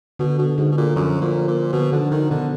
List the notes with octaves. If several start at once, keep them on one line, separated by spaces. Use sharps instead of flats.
B2 D3
B2
G#2 D3
B2
A#2
F#2 F3
A#2
A#2
B2 D3
D3 D#3
D3 D#3
B2 D3